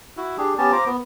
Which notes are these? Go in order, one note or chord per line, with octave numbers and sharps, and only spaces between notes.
E4 F#4
D4 G4 G#4
B3 C#4 G4 A5
F4 C5 A#5 D6
B3